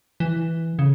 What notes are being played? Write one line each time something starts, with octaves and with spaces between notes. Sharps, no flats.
E3
C#3